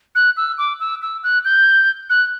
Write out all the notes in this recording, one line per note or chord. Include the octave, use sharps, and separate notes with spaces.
F#6
E6
D6
E6
E6
F#6
G6
F#6